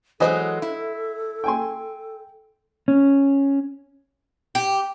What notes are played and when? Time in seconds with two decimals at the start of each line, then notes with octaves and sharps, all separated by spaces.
0.20 E3 F#3 G#3 A4 C5 D#5 G#5
0.62 E4
1.44 G5 G#5 C6
2.88 C#4
4.55 G4